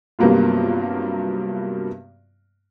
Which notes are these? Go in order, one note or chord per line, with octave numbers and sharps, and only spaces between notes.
G2 C3 F#3 A#3 B3 F4